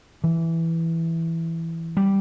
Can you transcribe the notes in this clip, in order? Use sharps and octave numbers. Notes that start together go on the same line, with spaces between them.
E3
G3